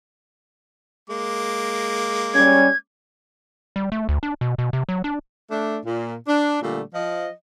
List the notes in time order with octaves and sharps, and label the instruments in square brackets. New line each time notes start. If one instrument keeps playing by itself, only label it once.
[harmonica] G#3 A#3 D6
[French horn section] G3 C#4 [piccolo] G#6
[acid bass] G3
A3
D2
D4
B2
B2
C3
F#3
D4
[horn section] A3 D4
A#2
D4
A#2 D3 G3 A3
F3 D#5